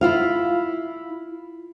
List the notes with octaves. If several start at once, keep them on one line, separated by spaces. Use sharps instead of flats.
E4 F4 F5